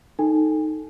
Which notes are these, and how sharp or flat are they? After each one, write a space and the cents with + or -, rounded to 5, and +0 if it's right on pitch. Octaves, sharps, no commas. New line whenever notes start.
D#4 +0 A4 +0 G#5 -35